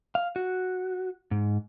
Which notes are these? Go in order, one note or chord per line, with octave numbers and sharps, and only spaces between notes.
F5
F#4
G#2